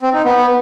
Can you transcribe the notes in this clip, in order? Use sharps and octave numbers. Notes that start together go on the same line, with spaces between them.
C4
D#4
B3